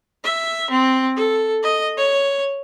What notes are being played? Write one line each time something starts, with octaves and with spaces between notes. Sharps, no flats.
E5
C4
A4
D#5
C#5